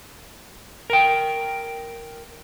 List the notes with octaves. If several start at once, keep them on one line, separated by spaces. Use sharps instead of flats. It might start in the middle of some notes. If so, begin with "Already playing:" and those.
A#4 G5